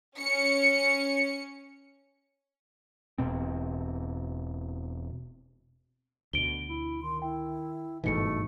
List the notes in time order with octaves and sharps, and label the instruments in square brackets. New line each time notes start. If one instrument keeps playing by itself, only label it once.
[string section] C#4 C#7
[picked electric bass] E1 B2 C4
[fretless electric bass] D2 B2 [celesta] D7 G7
[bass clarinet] E4
[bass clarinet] D#3 [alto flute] C6
[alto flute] E4 [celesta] G5
[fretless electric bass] G1 G#2 E3 [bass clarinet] B2 [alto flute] A3 [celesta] D#4 C#7